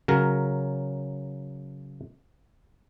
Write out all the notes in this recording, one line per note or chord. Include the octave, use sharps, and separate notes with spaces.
C#3 F#3 A#4